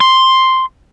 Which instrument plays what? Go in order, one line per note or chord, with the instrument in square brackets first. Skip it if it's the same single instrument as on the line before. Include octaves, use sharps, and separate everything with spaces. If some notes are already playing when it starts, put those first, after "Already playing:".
[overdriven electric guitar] C6